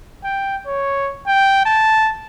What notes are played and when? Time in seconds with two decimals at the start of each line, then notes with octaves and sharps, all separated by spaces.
0.24 G5
0.66 C#5
1.27 G5
1.65 A5